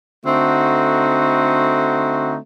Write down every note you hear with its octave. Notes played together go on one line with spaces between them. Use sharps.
D3 A3 C4 D#4 F#4